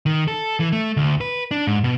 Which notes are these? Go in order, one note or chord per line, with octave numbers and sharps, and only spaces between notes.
D#3
A4
E3
A3
D2
B4
D4
G#2
B2